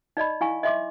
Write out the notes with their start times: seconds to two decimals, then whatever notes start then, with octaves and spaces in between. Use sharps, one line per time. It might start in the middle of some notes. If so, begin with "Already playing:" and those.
0.17 D#4 D5 D#5 B5
0.41 E4 F5 G#5 C#6
0.63 D#5 E5 C6 D6